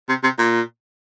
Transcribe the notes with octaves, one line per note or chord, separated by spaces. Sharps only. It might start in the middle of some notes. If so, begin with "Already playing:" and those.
C3
C3
A#2